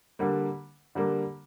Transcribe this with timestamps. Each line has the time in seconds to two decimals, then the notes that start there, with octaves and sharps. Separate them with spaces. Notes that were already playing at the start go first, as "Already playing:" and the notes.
0.19 D3 G3 A#3
0.95 D3 G3 A#3